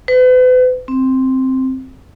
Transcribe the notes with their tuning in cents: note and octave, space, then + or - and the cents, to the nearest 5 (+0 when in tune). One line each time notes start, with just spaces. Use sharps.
B4 +40
C4 +0